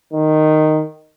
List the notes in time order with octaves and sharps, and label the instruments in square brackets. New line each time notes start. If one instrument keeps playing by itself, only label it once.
[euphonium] D#3